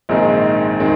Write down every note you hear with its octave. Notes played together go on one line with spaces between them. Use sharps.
A#1 G#2 D#3 G#3 C4
D#3 G#3 C4